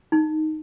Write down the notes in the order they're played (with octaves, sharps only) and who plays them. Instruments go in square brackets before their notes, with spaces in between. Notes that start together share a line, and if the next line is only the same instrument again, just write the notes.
[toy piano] D#4